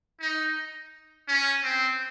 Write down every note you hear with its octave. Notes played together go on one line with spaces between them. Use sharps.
D#4
C#4
C4